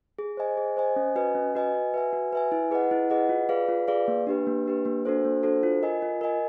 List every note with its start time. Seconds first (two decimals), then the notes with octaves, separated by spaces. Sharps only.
0.19 G#4
0.37 C5 D#5 G#5
0.57 G#4
0.77 C5 D#5 G#5
0.96 C#4
1.16 F#4 B4 D#5 G#5
1.35 C#4
1.55 F#4 B4 D#5 G#5
1.74 F#4
1.94 B4 E5 G#5
2.13 F#4
2.33 B4 E5 G#5
2.52 E4
2.71 G#4 B4 D#5 F#5
2.91 E4
3.10 G#4 B4 D#5 F#5
3.29 F4
3.49 G#4 B4 D5 F5
3.69 F4
3.88 G#4 B4 D5 F5
4.08 A#3
4.27 D4 G4 B4
4.47 A#3
4.66 D4 G4 B4
4.85 A#3
5.05 D4 F#4 A4 C5
5.25 A#3
5.43 D4 F#4 A4 C5
5.63 F4
5.83 A#4 D#5 G#5
6.02 F4
6.21 A#4 D#5 G#5